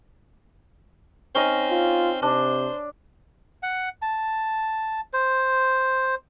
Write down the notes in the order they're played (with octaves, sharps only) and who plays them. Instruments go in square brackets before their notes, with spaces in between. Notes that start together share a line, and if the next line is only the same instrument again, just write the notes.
[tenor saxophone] C4 [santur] C#4 D#4 D#5
[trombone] F4
[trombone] C3 [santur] D4 [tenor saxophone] C5
[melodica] F#5
A5
C5